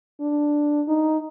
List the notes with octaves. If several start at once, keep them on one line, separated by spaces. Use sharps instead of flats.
D4
D#4